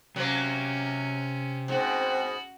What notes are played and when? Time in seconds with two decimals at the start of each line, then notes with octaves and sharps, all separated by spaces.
0.16 C3 F#3 A#3 C#4
1.68 G#2 B2 C4 F#4